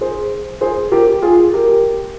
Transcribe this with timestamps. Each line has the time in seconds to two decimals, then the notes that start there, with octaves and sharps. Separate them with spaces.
0.01 G#4 C5
0.61 G#4 C5
0.92 G4 A#4
1.22 F4 G#4
1.54 G4 A#4